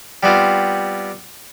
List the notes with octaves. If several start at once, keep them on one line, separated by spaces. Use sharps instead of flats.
G3 B3 C4 F4